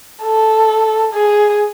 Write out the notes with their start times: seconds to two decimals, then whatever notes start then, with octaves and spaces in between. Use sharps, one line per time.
0.23 A4
1.13 G#4